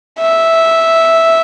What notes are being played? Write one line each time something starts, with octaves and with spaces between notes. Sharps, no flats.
E5